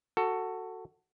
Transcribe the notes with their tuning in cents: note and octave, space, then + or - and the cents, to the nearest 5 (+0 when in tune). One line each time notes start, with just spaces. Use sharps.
F#4 +5 A4 +15